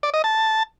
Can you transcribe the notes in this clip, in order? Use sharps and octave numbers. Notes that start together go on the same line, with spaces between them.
D5
D#5
A5